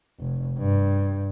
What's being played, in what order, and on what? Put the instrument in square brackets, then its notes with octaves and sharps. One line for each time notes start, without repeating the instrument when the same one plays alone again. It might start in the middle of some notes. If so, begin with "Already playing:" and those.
[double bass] F1
G2